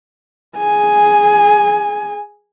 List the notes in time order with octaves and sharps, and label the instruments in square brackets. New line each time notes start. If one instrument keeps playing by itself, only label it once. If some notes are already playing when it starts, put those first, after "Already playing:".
[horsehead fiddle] G#4 G#5